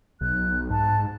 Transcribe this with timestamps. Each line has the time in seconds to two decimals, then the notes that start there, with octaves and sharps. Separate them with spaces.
0.21 B1 F#6
0.70 G#2 A5